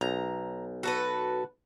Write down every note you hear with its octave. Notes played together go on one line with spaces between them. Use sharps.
B1 A#5
F#4 A4 B4